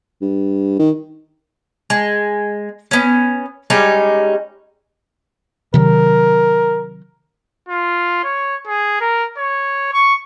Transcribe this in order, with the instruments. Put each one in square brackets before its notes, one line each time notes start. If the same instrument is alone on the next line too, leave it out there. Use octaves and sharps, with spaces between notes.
[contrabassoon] G2
D#3
[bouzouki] G#3
B3 C#4
G3 G#3 C#4 D#4
[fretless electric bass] C3 D#3 F#3 [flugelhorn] A#4
[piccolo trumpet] F4
C#5
G#4
A#4
C#5
C#6